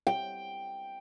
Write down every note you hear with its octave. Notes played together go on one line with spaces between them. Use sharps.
G5